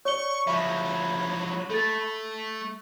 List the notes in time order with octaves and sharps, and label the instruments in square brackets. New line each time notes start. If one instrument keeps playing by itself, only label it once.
[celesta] C#5 D5 G7 [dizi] C#6
[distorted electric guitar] F3 F#3 [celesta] E5 [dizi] B5
[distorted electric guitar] A3 [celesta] A4 A6